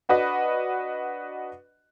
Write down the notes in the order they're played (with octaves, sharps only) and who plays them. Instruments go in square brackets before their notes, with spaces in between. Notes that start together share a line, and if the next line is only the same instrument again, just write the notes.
[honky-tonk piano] D4 F#4 B4 D#5